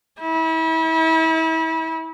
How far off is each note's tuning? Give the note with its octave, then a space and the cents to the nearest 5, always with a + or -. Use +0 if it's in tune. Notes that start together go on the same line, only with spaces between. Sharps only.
E4 -35